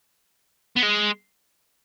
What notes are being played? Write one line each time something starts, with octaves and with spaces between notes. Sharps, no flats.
B3
G#3